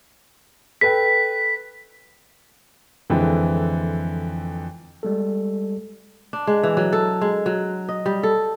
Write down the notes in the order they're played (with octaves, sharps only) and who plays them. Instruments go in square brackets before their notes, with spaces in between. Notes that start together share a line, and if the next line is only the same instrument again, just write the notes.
[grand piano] A4 B4 G5 [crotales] B6
[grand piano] F2 D3 E3 G#3
[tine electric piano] G3 G#3 A4
[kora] D4
G#3
E3
F#3
A4
G#3
F#3
D#5
G3
A4